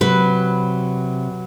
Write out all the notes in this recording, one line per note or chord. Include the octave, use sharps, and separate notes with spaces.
C3 F#3 B4